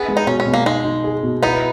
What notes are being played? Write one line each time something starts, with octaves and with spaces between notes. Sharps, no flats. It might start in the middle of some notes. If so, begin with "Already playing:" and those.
Already playing: B3 G#4
G#3
D#4
B2 C#4
C#4
B2
A#3
G#3 D#4
D#4
G#4
B2
B3 D#4 E4